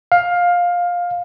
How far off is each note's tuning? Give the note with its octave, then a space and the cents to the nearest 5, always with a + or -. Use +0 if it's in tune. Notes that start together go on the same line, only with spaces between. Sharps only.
F5 +15